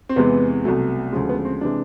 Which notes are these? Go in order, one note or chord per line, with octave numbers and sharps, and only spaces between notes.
C4
E2 C3 E3 G#3 B3
C2 B2 F#3 A3
D2 C#3 F3 G#3
B3
C4
C3 E3 G#3 D4